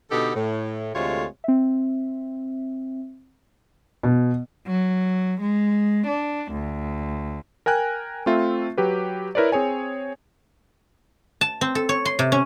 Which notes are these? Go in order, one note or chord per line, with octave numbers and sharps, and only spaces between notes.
B2 D3 B3 D#4 G4 A4
A2
D2 C3 G#3 A3 F4 C#5
C4 E5
B2
F#3
G#3
D4
D2
A#4 G5 G#5 F#6
A3 C4 F4 E5
F#3 G4 B4
E4 A#4 B4 C#5 D5
C4 G#4 C#5 G#5
A5
C4
A4
C#5
C6
C3
C#4